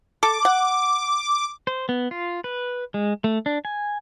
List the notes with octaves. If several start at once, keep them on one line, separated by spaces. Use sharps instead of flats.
A4 D6
F#5
C5
B3
F4
B4
G#3
A3
D4
G#5